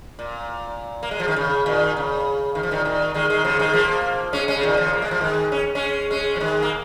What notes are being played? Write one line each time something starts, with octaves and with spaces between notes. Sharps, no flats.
A#2
A#3
G#3
F3
D#3
C#3
A#2 D#3
C#3
D#3
F3
A#2 D#3
A#2 D#3
D#3 G#3
D#3 G#3
C#3 F3
D#3 G#3
F3 A#3
G#3 C#4
G#3 C#4
C#3
A#2 D#3
C#3 F3
A#3
G#3
F3
D#3 G#3
C#4
G#3 C#4
G#3 C#4
F3
D#3 G#3
A#3